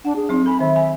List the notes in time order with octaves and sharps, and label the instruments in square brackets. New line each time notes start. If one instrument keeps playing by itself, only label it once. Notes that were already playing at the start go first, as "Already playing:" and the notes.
[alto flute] D4 [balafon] F#5
[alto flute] G#4
[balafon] F#3 C4 D#4
[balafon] A4 G#5 [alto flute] B5
[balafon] D#3 [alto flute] E5
[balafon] G#5 B5